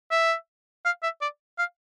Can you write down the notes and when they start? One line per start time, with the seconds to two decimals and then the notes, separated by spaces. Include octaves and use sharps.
0.11 E5
0.85 F5
1.03 E5
1.22 D5
1.58 F5